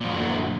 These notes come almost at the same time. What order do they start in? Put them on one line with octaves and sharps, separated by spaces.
A#2 F3 F#2 F#3 D3